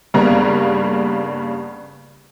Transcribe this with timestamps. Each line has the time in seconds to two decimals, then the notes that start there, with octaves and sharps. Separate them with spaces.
0.14 G2 C#3 G3 A#3 B3 A#5